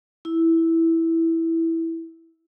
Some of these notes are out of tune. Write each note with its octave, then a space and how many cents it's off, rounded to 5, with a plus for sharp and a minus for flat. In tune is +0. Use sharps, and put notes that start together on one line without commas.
E4 -5